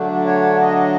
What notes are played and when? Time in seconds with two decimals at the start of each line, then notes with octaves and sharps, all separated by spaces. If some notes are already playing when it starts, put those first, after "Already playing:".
Already playing: D3 F#3 A3 D4
0.26 C#5
0.61 D#5